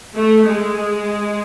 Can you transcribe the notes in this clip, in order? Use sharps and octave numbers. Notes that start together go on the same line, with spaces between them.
A3
G#3